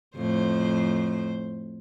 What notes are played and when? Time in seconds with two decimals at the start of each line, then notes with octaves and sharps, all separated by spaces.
0.16 F2 A2 C5